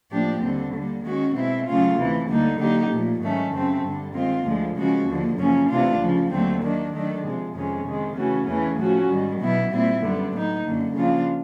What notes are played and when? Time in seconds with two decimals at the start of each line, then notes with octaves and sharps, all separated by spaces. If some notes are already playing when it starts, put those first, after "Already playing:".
0.11 A2 F3 A#3 D4 G4
0.42 D#2 D3 G3 C4
0.74 D3 G3 A#3
1.04 D#3 G#3 C#4 F#4
1.35 B2 G#3 C4 E4
1.66 C#3 F#3 A3 C#4 F4
1.97 D2 C3 E3 A3
2.28 D2 D3 G3 A#3 D#4
2.59 D3 F#3 A#3 D#4 G4
2.91 A#2 F3 A3
3.21 G#2 D#3 F#3 A3 C#4
3.52 F#2 C#3 F#3 A3 C4
3.84 G2 D3 G3
4.15 D#3 G#3 C4 F4
4.45 D2 D3 F3 G#3
4.75 C#3 F3 G#3 C#4 F#4
5.07 D#2 D3 F3 A#3
5.37 F#2 C#3 F3 A#3 C#4
5.69 C3 E3 A3 D4 F4
5.99 D2 C#3 F3
6.31 D#2 D3 F#3 A3 C4
6.62 D#3 F#3 A#3 D4
6.93 D#3 F#3 A3 D4
7.23 C3 F3 G#3
7.54 F2 C3 D#3 G#3 C#4
7.85 C3 D#3 G#3
8.16 C#3 E3 A3 C#4 F#4
8.47 E2 C#3 E3 A3 C#4
8.78 A2 F3 A3 C#4 F#4
9.09 G#2 D#3 G3
9.41 B2 F#3 B3 E4
9.71 A#2 G3 C4 E4
10.02 F#2 D3 G3 B3
10.34 A2 F#3 B3 D#4
10.64 F#2 D3 F#3 A#3
10.95 C#3 F3 A#3 D4 F4